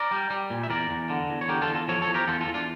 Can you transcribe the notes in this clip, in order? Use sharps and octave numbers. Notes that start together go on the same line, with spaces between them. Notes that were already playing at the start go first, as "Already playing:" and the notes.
Already playing: A#4 D5
G3
G3
A#2
E5
E2 A#4 D5
E2
D3
E2
C#5
D3 G4 A#4
F4 A4
E2
F4 A4
F3 A4 C#5
A4 C#5
E2
G4 A#4
E2 F4 A4
F4 A4
E2
D4 F4